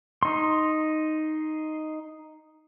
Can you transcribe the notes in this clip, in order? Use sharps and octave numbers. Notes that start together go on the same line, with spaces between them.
D#4 C6